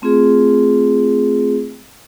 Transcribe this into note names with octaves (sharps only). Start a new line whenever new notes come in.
A3 C4 F4 G#4